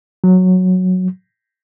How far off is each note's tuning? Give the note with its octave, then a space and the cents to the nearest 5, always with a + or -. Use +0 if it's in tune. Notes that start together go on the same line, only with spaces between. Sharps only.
F#3 -5